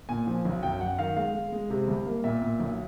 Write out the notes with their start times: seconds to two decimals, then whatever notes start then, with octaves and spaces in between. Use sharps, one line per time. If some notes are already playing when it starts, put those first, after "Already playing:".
0.09 A#2 G#5
0.27 F3
0.45 B1
0.63 F#2 G5
0.80 F#2 F#5
0.98 D#3 F5
1.17 G#3 F5
1.34 G#3
1.52 G#3
1.70 C3
1.88 C2
2.06 A#3
2.24 A#2 E5
2.42 A#2
2.60 B1